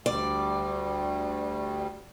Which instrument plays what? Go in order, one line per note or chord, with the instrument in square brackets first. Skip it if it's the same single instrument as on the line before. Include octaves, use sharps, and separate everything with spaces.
[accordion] D2 G3 [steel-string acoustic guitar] D5